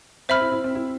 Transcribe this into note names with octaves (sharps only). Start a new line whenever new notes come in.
C4 C5 E5 B5 F6
E4
E4
C4
E4